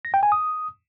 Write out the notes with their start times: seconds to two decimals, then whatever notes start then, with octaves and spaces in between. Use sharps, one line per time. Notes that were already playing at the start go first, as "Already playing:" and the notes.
0.05 A#6
0.14 G5
0.23 G#5
0.32 D#6